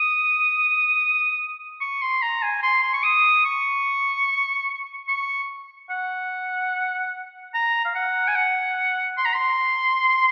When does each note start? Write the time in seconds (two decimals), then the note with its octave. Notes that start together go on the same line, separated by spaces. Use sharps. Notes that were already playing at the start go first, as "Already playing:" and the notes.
Already playing: D#6
1.81 C#6
2.02 C6
2.22 A#5
2.43 G#5
2.63 C6
2.82 C6
2.93 C#6
3.04 D#6
3.45 C#6
5.09 C#6
5.90 F#5
7.54 A#5
7.85 F5
7.95 F#5
8.28 G#5
8.36 F#5
9.17 C6
9.25 A#5
9.34 C6